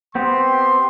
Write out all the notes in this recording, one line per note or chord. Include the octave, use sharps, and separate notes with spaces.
B3 C4 G4 C6